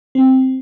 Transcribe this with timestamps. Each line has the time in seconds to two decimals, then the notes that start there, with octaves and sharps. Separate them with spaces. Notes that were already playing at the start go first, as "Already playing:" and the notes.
0.15 C4